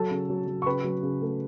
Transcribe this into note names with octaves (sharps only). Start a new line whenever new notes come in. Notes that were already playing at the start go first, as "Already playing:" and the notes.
Already playing: F#3 A4 A5
C#3
F#3
F#3
C#6
C#3 B4 B5
F#3
C#3
A3